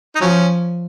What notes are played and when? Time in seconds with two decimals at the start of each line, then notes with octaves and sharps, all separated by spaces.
0.16 D#4
0.20 F3 F#3 C#4